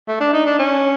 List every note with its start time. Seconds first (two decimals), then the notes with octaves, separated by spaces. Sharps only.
0.08 A3
0.20 D4
0.33 D#4
0.47 D4
0.59 C#4